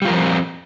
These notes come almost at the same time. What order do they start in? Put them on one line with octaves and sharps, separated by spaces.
G3 F4 A#4 F3 C4